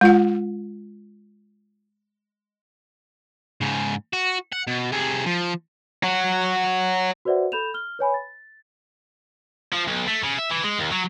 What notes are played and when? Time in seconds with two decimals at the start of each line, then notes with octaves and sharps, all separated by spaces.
0.01 G#3 F4 F#5
3.61 G#2 C#3
4.13 F#4
4.52 F#5
4.67 B2
4.92 C3 G#4
5.26 F3
6.03 F#3 F#4
7.25 F#4 B4 C5 D5 E5 F#5
7.52 A4 B5 G6 E7 F7
7.74 F6 G7
7.99 B4 C#5 G#5 B5
8.14 A6
9.72 F3
9.88 B1
10.07 A3
10.24 C#3
10.39 E5
10.51 E3
10.64 G#3
10.80 D#2
10.93 F#3